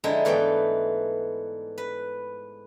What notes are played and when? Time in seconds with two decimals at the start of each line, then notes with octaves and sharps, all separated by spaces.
0.04 D3 F3 G#3 D#4 E4
0.25 G#2 E3 A3 B3 G5
1.78 B4